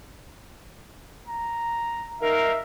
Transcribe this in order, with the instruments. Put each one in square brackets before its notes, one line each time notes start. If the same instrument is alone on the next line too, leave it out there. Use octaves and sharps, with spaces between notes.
[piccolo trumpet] A#5
[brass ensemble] D#4 A#4 F5 [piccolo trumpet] E5